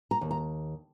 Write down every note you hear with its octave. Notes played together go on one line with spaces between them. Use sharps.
A#5
D#2
A#5